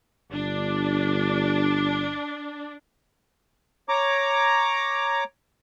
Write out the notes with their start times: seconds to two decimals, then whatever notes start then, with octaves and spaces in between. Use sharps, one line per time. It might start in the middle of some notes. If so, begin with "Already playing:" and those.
0.32 G1 D4
3.89 C#5 A#5 D6